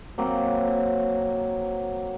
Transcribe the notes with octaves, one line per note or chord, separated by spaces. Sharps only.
F#3 A#3 C4